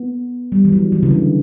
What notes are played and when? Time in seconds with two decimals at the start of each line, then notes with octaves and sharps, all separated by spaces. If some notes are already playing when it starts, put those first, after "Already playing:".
Already playing: B3
0.52 G3
0.65 E3
0.72 F#3
0.92 E3
1.03 C#3
1.11 D3